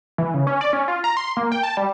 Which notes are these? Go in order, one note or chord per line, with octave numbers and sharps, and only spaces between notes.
E3
C#3
C#4
D5
C#4
F4
A#5
C6
A#3
G5
A5
G3